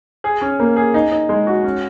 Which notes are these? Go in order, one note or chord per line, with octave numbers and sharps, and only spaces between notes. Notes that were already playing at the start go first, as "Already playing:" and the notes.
G#4
C#4
A#3
G#4
D#4
D#4
G#3
F#4
C#4